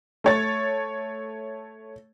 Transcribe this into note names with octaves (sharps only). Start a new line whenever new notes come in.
A3 C#5 A6